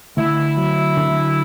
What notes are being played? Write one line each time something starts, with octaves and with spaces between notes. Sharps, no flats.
D2 E4
F#3
D3